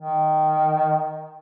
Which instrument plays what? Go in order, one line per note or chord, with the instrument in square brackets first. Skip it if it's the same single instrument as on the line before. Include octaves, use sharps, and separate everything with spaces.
[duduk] D#3